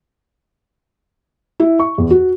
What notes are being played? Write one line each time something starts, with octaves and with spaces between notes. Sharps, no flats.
E4
C#6
E2
F#4